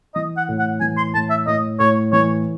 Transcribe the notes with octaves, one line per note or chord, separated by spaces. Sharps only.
E3 D#5
F#5
A2
F#5
E3 G#5
C6
A2 A5
E5
A2 D#5
A2 C#5
E3 C#5